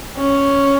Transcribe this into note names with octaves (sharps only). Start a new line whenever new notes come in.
C#4